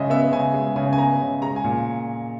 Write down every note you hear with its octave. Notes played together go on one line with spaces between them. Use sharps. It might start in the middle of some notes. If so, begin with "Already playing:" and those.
Already playing: C#3 G#3 D#5 E5
B3 E5
C#3 G#5
G#3
C#3 G#5
G#5
B3 A#5
C#3
G#3 A#5
G#5
A#2